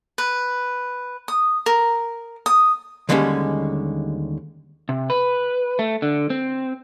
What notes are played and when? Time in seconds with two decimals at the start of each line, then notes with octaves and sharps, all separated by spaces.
0.18 B4
1.28 D#6
1.66 A#4
2.46 D#6
3.09 D#2 D3 G3 G#3 C4 C#4
4.89 C3
5.10 B4
5.79 A3
6.02 D3
6.30 C4